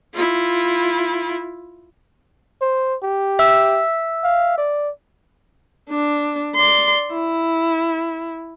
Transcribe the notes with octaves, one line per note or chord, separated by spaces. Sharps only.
E4 F4
C5
G4
E5 E6
F5
D5
D4
D5 C6
E4